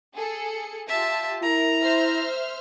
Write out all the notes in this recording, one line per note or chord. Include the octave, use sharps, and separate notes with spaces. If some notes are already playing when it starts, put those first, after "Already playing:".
G#4 A4 C#7
F4 G4 E5 A5
E4 A#4 A#5
C5 E5 F6